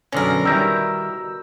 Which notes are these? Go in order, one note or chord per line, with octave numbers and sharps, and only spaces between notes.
F#2 B2 D3 C#4 A#4
D#3 G3 E4 A#5 E6 G6 A#6